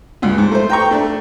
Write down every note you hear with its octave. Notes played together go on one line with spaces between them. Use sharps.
C#2 G2
G#2
A3 C5
G5 A#5 C#6
A3 D4